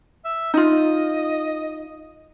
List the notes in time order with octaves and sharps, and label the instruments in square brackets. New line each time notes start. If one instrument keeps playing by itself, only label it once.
[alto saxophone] E5
[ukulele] D#4 F4 [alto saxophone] D#5